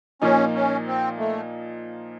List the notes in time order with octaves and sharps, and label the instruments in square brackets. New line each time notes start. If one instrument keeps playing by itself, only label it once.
[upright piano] A#2 F3 A#3 D#4 [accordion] C#4
[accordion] C#4
C4
A3